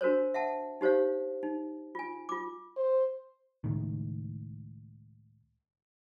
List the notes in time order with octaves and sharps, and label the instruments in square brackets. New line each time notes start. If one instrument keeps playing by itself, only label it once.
[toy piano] D4 F#4 A#4 C5 C#5
E5 F#5 A5
D#4 G4 C5 C#5 F5
D#4
F4 G#5
F4 D6
[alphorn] C5
[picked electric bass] C#2 A2 D#3